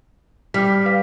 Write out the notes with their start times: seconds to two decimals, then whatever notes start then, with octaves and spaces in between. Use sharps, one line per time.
0.54 G3 D6 F6 B6
0.85 B4 F5 B6